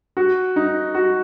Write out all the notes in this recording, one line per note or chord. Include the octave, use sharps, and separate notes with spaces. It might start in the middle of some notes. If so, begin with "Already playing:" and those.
F#4
D#4
F#4